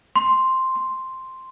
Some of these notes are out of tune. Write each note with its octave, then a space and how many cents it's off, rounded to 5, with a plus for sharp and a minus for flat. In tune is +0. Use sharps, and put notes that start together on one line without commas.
C6 +0
C6 +0